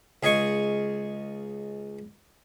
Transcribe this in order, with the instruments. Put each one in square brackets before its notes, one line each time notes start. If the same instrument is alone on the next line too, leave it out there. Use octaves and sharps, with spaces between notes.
[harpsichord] C#2 G#4 D#5 G#5 C#6